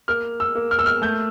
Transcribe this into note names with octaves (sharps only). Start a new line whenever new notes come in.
A#3 F6
E6
A#3
F6
E6
F6
A3 G6